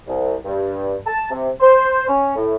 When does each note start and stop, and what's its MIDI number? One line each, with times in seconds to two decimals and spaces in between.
0.07 0.35 36
0.45 0.95 43
1.06 1.28 81
1.31 1.49 48
1.60 2.05 72
2.09 2.35 61
2.36 2.55 45